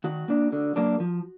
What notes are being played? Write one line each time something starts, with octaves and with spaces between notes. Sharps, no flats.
D#3 F#4
A#3 D4
D3
F#3 A#3 D4
F3